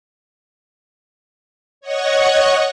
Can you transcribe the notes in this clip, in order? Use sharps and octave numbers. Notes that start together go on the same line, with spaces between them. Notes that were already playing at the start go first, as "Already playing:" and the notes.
C#5 D#5 F#5 C#6